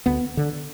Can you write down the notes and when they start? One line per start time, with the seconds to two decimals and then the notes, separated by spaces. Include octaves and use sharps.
0.06 D2 B3
0.37 D3